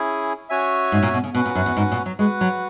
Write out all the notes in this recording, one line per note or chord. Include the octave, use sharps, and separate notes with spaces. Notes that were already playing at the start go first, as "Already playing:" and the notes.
Already playing: C#4 E4 G#4
C#4 F#4 C#5 E5 G#5
G#2
A#2
B2
C#3
B2 C#4 F#4 B4 F#5
A#2
F#2
E2
G#2
A#2
F#3
G#3 F#4 B4 F#5
F#3